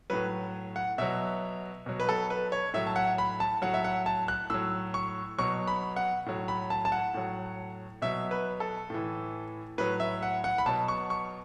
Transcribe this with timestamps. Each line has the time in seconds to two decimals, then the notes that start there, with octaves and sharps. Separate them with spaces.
0.10 A2 F#3 B4
0.76 F#5
0.98 B2 F#3 E5
1.86 B2 F#3
2.00 B4
2.09 A4
2.30 B4
2.52 C#5
2.74 A2 F#3 E5
2.87 A5
2.96 F#5
3.18 B5
3.40 A5
3.62 A2 F#3 F#5
3.74 E5
3.84 F#5
4.06 A5
4.28 F#6
4.50 A2 F#3 E6
4.94 C#6
5.38 B2 F#3 C#6
5.68 B5
5.96 F#5
6.26 A2 F#3
6.48 B5
6.70 A5
6.85 A5
6.92 F#5
7.14 A2 F#3
8.02 B2 F#3 E5
8.31 B4
8.60 A4
8.90 A2 E3
9.78 A2 F#3 B4
10.00 E5
10.23 F#5
10.44 F#5
10.58 B5
10.66 B2 F#3 A5
10.88 C#6
11.10 C#6